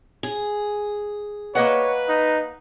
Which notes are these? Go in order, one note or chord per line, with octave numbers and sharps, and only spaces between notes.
G#4
A#3 B4 C#5 D#5 F#5
D#4